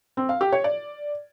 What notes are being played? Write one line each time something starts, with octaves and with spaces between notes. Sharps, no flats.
C4
F5
G4
C#5
D5